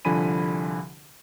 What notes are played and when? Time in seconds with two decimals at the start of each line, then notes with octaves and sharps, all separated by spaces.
0.05 C2 D3 F3 G#5 B5 D#7